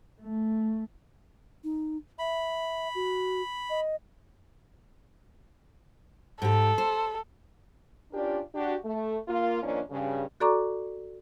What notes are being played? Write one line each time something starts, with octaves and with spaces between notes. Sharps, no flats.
A3
D#4
E5 B5
F#4
D#5
G#2 G4 A4
C5
C#4 D4 F4 G4 A#4 D5
D4 F#4 G4
A3
A#3 F4
D#3 F3 A#3 C#4 D4
G2 C#3
F#4 A4 D5 A#5 C#6 D6